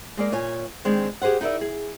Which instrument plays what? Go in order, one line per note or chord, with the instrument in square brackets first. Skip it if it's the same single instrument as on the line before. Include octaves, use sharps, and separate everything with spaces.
[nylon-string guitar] G#3 A#3 D5
A#2 C#5 G#5
D#3 G#3 C4 D4
G4 G#4 B4 C5 F#5
D#4 E4 A#4 D5 E5
G#4